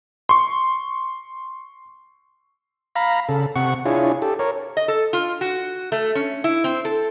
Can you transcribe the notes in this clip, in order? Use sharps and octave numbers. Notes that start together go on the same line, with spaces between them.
C6 C#6
F5 A#5 B5
C#3 A4
C3 F#5 C#6
D4 E4 F4 G#4 C#5
G4 A4
A#4 C#5
D#5
A4
F4
F#4
A3
C#4
E4
C4
A4